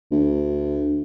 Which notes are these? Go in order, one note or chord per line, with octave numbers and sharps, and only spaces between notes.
D2